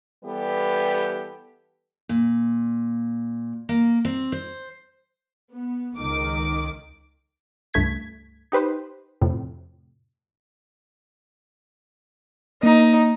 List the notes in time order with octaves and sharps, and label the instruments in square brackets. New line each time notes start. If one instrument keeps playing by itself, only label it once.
[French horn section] E3 G3 B3 G4 A4 B4
[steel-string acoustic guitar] A#2
A#3
C4
C5
[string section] B3
C#2 D#3 D6
[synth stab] C#2 G2 A3 G#6 B6
D#4 G4 B4 C5
F2 A2 C3
[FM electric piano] A#3 [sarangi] D#4